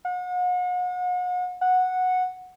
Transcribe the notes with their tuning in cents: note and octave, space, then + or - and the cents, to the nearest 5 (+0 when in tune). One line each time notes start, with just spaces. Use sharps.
F#5 -40
F#5 -10